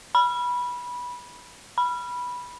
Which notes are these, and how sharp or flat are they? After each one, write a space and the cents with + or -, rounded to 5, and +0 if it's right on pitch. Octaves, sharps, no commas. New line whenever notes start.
B5 -15
B5 -10